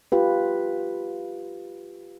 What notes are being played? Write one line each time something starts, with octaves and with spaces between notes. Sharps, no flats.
F4 G4 B4